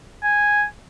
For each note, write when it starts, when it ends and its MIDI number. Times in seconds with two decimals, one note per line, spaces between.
0.23 0.64 80